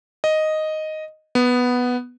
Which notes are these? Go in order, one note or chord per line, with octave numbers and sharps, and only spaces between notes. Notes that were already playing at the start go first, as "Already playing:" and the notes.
D#5
B3